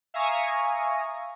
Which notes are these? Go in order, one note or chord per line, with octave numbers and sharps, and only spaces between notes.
E5 F5 G#5 A#5 C#6 D#6